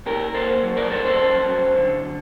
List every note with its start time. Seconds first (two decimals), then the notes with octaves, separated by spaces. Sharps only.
0.06 A#2 G4 A#4
0.34 A#3 A4 C5
0.63 F#3
0.77 A#4 D5
0.91 A#2 A4 C5
1.05 A4 C5
1.19 F#2
1.48 F#3
1.76 D3